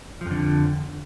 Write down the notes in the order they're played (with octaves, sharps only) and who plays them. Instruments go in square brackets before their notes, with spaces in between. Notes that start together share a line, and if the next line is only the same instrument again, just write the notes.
[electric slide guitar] F3
F2
D3